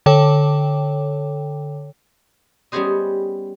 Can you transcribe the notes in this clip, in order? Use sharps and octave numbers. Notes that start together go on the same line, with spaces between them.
D3 A4 C#5 G5
G3 B3 C#4 G#4 C5 D#5